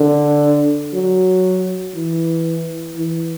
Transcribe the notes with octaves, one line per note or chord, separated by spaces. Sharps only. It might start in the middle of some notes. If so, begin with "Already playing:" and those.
Already playing: D3
F#3
E3
E3